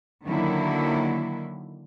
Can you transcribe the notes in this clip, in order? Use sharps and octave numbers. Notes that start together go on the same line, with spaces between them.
D3 D#3 F#3 A#3 E4